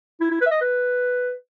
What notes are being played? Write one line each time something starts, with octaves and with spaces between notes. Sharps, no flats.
E4
E4
B4
E5
D#5
B4